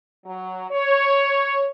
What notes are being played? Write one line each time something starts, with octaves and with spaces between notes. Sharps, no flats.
F#3
C#5